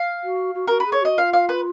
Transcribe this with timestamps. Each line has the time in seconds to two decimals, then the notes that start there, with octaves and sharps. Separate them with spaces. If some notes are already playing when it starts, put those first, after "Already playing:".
Already playing: F5
0.24 F#4
0.55 F#4
0.67 F#4 A#4
0.80 B4
0.86 G#4
0.92 C#5
1.02 F#4 D#5
1.17 F4 F5
1.33 F5
1.49 B4